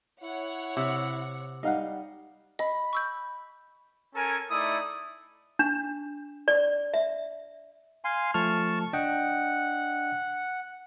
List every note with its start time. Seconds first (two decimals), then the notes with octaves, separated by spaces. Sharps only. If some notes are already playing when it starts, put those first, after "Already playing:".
0.23 E4 C#5 F#5
0.77 C3
1.63 G3 D#4 F5 F#5
2.59 D#5 B5
2.93 C#6 E6 G6
4.15 C#4 A4 A#4 G#5
4.50 A3 D#4 E4 D5 D#6
5.59 D4
6.48 D5
6.94 E5
8.05 F5 G#5 C6
8.34 F3 A3 A5 C#6 F6
8.93 D4 D#5 F#5 G5